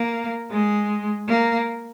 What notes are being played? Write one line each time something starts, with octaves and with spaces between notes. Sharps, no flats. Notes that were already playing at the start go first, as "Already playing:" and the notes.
Already playing: A#3
G#3
A#3